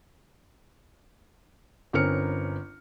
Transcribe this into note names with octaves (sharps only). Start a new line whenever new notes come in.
G1 C4 C#4 A#4 F6 C#7